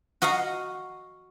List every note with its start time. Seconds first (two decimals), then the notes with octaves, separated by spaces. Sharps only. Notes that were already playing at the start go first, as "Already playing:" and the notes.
0.22 F#4 D#5 F5 F#5 A#5